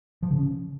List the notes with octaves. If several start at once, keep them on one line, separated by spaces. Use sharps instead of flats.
F3
C#3
C#4